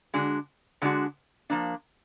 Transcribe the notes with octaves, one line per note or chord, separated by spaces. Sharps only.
D3 G#3 D4 F#4
D3 G#3 D4 F#4
F3 A#3 D4